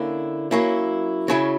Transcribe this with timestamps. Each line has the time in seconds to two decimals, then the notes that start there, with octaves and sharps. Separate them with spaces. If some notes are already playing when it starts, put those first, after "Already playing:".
Already playing: D3 A#3 C#4 E4
0.51 F#3 A#3 C#4 E4
1.28 C#3 F#3 C#4 E4